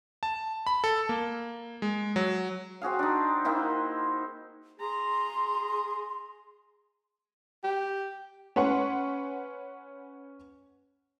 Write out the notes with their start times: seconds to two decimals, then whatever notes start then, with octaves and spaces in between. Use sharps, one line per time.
0.23 A5
0.67 B5
0.84 A4
1.09 A#3
1.82 G#3
2.16 F#3
2.82 C4 F#4 G#4 F5
2.99 D4 D#4
3.45 A#3 C4 D#4 E4
4.80 G#4 A#5 C6
7.63 G4
8.56 C#4 B4 F#5 C6 C#6